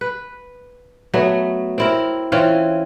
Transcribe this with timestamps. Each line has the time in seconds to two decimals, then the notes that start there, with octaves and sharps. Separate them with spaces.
0.01 B4
1.14 F#3 A3 B3
1.78 C4 E4 A#4
2.32 E3 C4 C#4 F4